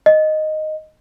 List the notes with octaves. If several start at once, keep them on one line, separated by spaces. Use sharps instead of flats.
D#5